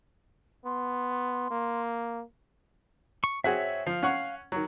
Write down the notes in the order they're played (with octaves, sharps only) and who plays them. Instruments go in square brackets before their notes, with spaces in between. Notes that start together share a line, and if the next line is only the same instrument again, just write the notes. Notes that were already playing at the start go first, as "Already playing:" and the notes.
[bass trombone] B3 [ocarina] C6
[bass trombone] A#3
[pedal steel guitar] C#6
[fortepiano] C4 F#4 G#4 [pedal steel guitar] C#5 E5
[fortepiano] F3 [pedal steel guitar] F5
[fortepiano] C#4 F#5 C#6
D#3 F#3